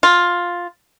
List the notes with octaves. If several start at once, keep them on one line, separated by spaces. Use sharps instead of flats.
F4